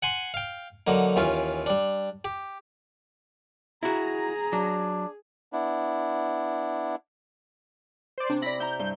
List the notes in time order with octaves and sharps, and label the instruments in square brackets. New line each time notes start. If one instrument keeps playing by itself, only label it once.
[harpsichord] F#5 G#5 C6
F5 G5
D3 F#3 A#3 D#4
D#2 E3 C#4 F4
G3 D4
G4
[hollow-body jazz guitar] E4 F#4 [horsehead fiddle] G#4 [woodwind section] A#5
[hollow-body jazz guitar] F#3 [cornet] D4
[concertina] B3 D4 E4
[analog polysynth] C5 D5
[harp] C3 [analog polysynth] D4
[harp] E4 D5 [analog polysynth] B5 A#6 B6
[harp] E4 A#5 [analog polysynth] G6
[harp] G2